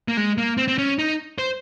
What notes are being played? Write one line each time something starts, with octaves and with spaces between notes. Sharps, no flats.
A#3
G#3
A#3
C4
C4
C#4
D#4
C5